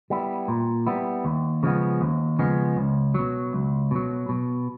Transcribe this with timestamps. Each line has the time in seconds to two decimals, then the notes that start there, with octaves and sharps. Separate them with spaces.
0.10 G3 B3 E4
0.48 A#2
0.86 G3 B3 E4
1.25 D#2
1.63 C#3 F3 G#3 B3
2.01 D#2
2.39 C#3 F3 G#3 B3
2.77 C#2
3.14 B2 F#3
3.53 C#2
3.91 B2 F#3
4.29 B2